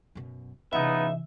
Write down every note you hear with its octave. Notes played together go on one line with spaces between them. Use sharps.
F#2 B2
C#2 C3 E3 B3 D#4 E5